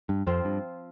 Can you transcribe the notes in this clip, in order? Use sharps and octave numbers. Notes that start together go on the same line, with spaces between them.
G2
F2 F3 C4 F4
G2